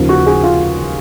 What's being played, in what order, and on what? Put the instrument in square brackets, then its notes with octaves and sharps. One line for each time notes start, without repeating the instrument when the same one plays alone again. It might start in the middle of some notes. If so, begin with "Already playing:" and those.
Already playing: [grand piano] D#2 C#3 F3
F#4
G#4
F4